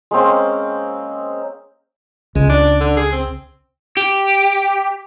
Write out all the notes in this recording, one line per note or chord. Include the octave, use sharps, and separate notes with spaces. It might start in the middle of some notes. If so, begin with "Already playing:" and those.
G#3 A#3 C4 C#4
C#2 G#3
D4
D3
G#4
C4
G4